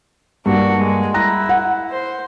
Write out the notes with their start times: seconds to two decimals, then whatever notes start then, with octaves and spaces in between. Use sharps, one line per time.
0.46 G2 A#3 D4 F#4
0.77 G#3
1.14 E4 A#5 F#6 A#6
1.49 F#5
1.90 C5